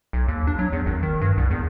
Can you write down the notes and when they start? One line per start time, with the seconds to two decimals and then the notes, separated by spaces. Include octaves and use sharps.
0.13 B1
0.28 D#2
0.47 D4
0.59 F#3
0.73 E2
0.86 G#1
1.03 D#3
1.22 G2
1.37 C2
1.51 E2